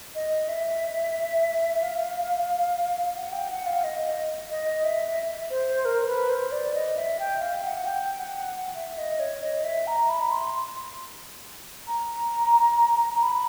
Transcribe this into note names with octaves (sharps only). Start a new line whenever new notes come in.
D#5
E5
F5
F#5
G5
F#5
F5
D#5
D#5
D#5
E5
C5
A#4
B4
C5
D5
D#5
E5
G5
F5
F#5
G5
F#5
E5
D#5
C#5
D#5
E5
A#5
B5
C6
A#5
B5